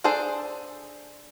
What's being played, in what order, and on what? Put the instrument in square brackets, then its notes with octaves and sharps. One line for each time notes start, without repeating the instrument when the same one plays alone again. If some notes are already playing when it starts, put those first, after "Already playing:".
[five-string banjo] D4 G#4 A4 C5